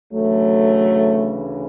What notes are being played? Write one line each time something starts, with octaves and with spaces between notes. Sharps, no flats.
D2 C#3 E3 F#3 A3